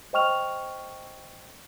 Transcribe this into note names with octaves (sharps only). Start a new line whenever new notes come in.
C5 D#5 G5 C#6 F6 F7